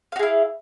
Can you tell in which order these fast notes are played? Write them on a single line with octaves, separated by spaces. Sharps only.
F5 F#4 G#4 E4